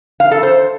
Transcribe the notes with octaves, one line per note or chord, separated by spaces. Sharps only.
F5
A4
C5